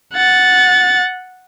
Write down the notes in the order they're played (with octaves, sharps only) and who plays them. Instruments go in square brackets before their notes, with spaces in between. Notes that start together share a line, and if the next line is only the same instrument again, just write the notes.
[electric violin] F#5 A6